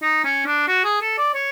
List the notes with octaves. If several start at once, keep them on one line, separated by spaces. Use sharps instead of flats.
D#4
C#4
D4
F#4
G#4
A4
D5
C#5